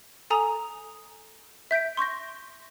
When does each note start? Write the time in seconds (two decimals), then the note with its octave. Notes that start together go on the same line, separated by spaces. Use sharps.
0.30 A4 G#5 A#5 D#6 F7
1.71 E5 G6 B6 D7
1.97 C6 C#6 G6 A#6